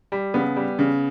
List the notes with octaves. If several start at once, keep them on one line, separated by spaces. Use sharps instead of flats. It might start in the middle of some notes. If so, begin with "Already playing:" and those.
G3
C#3 B3
G3
C#3